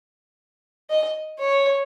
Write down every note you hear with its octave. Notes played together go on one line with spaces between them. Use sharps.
D#5
C#5